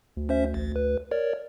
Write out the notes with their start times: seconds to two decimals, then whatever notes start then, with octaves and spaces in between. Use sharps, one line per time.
0.17 D2
0.29 C#4 C5 E5
0.54 A1
0.76 B4
1.11 A#4 C#5 D5